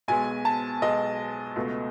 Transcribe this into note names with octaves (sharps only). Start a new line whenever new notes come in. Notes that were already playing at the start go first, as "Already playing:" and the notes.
B1 B2 G#3 G#5
A5
B1 B2 G#3 D#5
C#2 B2 A3